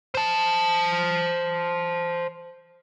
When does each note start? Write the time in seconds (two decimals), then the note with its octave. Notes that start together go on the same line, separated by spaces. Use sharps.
0.14 C5 A5